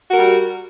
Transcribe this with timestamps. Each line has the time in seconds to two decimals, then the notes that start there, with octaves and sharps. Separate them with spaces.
0.09 F#4
0.13 A#4
0.17 G3